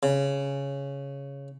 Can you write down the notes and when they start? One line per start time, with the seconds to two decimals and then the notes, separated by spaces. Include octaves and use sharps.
0.03 C#3